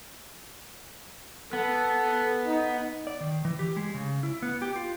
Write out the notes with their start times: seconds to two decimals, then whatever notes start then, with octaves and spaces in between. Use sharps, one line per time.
1.53 B3 A4
2.47 D#4
3.07 D5
3.21 D#3
3.45 E3
3.59 G4
3.77 G#3
3.94 C#3
4.23 E4
4.42 B3
4.62 G4
4.76 F4